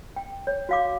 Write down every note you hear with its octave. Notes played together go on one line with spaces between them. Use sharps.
G5
C#5
F#4 F5 D6